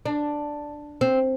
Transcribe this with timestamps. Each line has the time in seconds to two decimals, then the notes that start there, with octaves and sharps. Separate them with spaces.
0.06 D4
1.01 C4